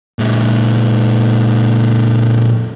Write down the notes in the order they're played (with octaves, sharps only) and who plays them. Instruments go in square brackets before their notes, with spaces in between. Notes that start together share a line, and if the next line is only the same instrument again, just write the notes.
[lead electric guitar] A#2 G#3